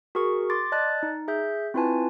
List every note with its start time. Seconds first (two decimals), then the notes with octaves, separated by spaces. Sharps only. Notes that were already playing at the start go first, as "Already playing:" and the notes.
0.15 F#4 G#4 A#4 C#6
0.50 C6 D6 A6
0.72 D5 D#5 A5 F#6 A6
1.03 D#4
1.28 G#4 E5 G6
1.74 C4 E4 F4 B4 G#5 A5